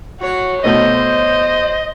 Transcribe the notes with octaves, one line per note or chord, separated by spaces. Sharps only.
A2 F#3 F#4 C#5
B2 A3 C4 C5 D#5